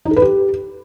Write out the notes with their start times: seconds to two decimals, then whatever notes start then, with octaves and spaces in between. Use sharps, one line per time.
0.05 D#4
0.11 A4
0.16 B4
0.22 G4